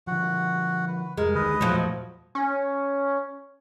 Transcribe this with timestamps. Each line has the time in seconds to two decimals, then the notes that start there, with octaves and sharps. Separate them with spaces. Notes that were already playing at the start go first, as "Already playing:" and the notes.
0.07 D3 F3 F#4 F#5
0.88 B4
1.17 F1 G#3 A#4
1.35 D2 D3 D#3 B4 D#5
1.61 E1 A#2 F3 F#3 A3
2.35 C#4